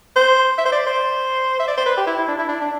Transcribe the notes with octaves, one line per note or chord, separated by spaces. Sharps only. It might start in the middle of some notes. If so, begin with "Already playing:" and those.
C5
E5
C5
D5
C5
E5
D5
C5
B4
G4
E4
E4
D4
E4
D4
D4